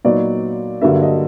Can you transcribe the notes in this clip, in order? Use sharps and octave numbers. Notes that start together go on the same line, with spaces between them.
A#2 F#3 B3 D#4 D5
G2 D3 F#3 A#3 D4 E5
D#5